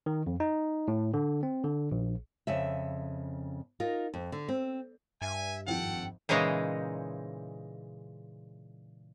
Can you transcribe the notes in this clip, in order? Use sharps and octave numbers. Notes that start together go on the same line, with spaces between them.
D#3
F2
D#4
A2
D3
C4
D3
A#1
F2 C#3 E5
D#4 F4 A#4
F2
D3
C4
G2 E5 G#5
G#1 F2 F3 A4 F#5 G5
A#2 C#3 E3 G#3 D#4